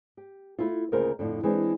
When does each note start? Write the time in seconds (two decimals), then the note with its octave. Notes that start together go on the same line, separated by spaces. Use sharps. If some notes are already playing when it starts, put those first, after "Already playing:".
0.17 G4
0.59 A3 E4 F4
0.92 D2 C#3 A#3 F4 A#4 C5
1.19 F2 A2 D3
1.43 E3 G#3 C4 D4